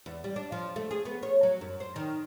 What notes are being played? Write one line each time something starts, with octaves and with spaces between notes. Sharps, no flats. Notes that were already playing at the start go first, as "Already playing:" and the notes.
E2
G3
D4
F3
A3
G#4
B3
C#5
F#3
F#2
C5
D#3